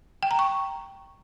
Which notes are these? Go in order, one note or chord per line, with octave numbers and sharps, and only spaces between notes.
G5
A#5
C#6